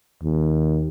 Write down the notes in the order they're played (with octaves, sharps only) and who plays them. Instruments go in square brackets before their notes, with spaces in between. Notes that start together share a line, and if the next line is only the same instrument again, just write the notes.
[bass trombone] D#2